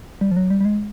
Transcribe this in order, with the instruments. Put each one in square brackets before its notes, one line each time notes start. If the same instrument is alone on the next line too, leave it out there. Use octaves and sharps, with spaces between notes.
[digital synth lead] G3
F3
F#3
G3
G3
G#3